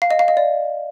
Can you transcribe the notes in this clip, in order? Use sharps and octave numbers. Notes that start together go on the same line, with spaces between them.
F5
D#5
F5
D#5
D5